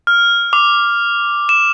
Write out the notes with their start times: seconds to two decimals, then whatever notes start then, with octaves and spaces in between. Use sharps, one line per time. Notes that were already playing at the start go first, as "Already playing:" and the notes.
0.07 F6
0.53 D6
1.49 E7